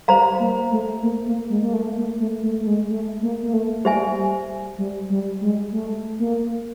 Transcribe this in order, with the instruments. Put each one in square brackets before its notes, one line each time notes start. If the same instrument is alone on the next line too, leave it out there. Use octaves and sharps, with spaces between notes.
[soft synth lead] G3 [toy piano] C5 F5 A#5
[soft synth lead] A#3
A3
A#3
A#3
G#3
A#3
A3
A#3
A3
A3
A3
G#3
A3
A#3
A#3
A3
[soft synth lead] G3 [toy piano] G4 C5 E5 G#5
[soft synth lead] G3
G3
G#3
A3
A#3